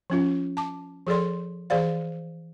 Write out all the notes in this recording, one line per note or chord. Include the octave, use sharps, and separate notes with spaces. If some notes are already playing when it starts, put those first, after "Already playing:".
F3 C#4 F4
A5 D6
F3 G#4 A4 D5 C6
E3 G#4 C5 D5 F5